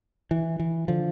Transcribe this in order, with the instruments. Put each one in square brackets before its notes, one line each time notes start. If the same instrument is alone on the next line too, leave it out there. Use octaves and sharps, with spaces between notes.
[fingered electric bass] E3
E3
D3 F3